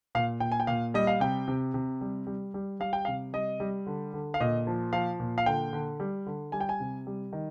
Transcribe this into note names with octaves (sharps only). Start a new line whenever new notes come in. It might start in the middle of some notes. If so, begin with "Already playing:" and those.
A#2 F5
A#2 G5
G#5
G5
A#2 F5
G3 D#5
F5
C3 G5
C3
C3
G3
G3
G3
G3 F5
G5
C3 F5
G3 D#5
G3
D3
D3
F5
A#2 D#5
F3
F3 F5
A#2
F5
D3 G5
D3
G3
D3
G3 G#5
G5
G#5
C3
G3
D#3